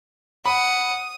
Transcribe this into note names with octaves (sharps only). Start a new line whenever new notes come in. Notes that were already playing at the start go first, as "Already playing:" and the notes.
F#5 B5 D#6